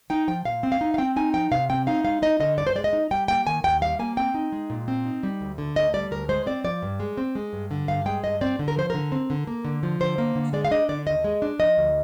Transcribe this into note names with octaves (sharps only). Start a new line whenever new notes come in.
D#4 G5
F3 G5
A#2 F5
C4
F5
D#4
F5
C4 G5
D#4 G#5
F3 G5
C3 F5
C4 G5
D#4 F5
G#3 F5
D#4 D#5
D3 D#5
G2 D5
C5
G#3 D5
D#5
D#4
G3 G5
A#3 G5
D#3 G#5
D#2 G5
G3 F5
A#3 G#5
C4 G5
D#4
G#3
A#2
C4
D#4
G3
D2
D3
D2 D#5
G3 D5
D2 A#4
G#3 C5
C4 D5
F3 D5
G2
G#3
C4
G#3
G2
D3
G2 F5
G#3 G5
G2 D#5
C4 D5
D3
A#4
F3 C5
D3 A#4
C4
D3
A#3
D3
F3
D3 C5
A#3
D3
G#3 D5
F5
D4 D#5
D3 D5
D#2 D#5
G#3
D4
F3 D#5
D2